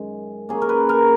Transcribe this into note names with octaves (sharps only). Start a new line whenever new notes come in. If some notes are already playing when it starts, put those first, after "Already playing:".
Already playing: F#2 D#3 G#3
A#2 A#3 C#4 G#4
A#4
B4
A#4